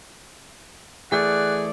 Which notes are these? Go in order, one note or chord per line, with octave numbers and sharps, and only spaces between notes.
E3 A3 G#4 D5 F#5